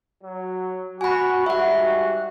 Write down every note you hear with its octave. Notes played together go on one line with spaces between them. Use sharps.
F#3
F#4 G#5 B5
G#2 G3 F#4 E5 F#5